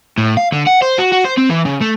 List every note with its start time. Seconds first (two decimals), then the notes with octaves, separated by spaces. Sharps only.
0.18 A2
0.37 F5
0.52 D3
0.67 F#5
0.82 C5
0.98 F#4
1.12 F#4
1.24 C5
1.37 C4
1.50 E3
1.65 C#3
1.81 A3